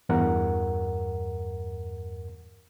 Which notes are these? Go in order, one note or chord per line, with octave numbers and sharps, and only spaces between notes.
E2 G2 A#4 F#5